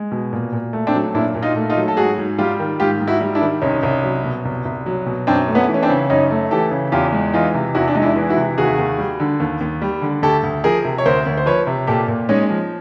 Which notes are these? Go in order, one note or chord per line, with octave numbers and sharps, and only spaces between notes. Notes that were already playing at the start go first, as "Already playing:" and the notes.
Already playing: G#3
B2
A#2
A#2
A3
C4 D4
F#3
A#2 D4 E4
A#2
D#4 F4
A3
D#4 F4
F#3
A4
G#2 F#4 G#4
G#2
G3 F4 G4
D#3
G#2 F4 G4
G#2
E4 F#4
G3
D4 E4
D#3
C2 C#4 D#4
C2
F#3
B2
C2
C2
F#3
B2
F#2 C4 D4
A3
B3 C#4
E3
C#4
C4 D4
C#3
F#2 C#4 D#4
A3
E3 G4 A4
C#3
E2 F4 G4
G#3
E3 D#4 F4
C3
E2 E4 F#4
D4
G#3 D#4
D4 E4
E3
E4 F#4
C3
D#2 F#4 G#4
D#2
G3
D3
D#2
D#2
G3
D3
D2 G4 A4
D2
F3 G#4 A#4
C3
C#5
D2 A#4 C5
D2
C5
F3 B4 C#5
C3
A#2 G4 A4
A#2
G#3 C#4 D#4
F3